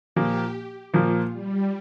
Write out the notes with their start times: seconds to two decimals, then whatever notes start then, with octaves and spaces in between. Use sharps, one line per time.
0.16 A#2 F3 A#3 G4
0.94 A#2 F3 A#3 F4
1.32 G3